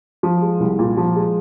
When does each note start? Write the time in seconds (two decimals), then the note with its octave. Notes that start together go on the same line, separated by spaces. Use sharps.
0.23 F3
0.42 G#3
0.60 C2
0.79 A#2
0.97 F3
1.16 G#3